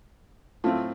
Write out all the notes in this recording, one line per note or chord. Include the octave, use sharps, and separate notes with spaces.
A2 A3 C4 F4